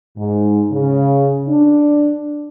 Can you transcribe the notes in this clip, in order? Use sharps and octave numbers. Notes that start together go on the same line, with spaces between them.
G#2
C#3
D4